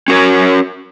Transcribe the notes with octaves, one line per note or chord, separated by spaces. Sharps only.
C#4 F#4 A#4 C#5